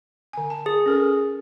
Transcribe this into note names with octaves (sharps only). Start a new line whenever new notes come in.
D3 G#5
A5
G#4
C#4 A4 A#4